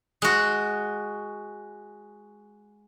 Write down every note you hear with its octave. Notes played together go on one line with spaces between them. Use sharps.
G#3 F#4